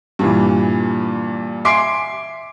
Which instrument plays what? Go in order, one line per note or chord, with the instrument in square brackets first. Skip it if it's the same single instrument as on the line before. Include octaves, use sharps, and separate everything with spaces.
[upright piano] G2 A#2 E3
E5 G#5 C6 D6 C7 D7